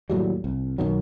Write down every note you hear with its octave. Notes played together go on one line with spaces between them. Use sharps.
D#2 A2 F#3 G3
C2
B1 B2 D#3 F#3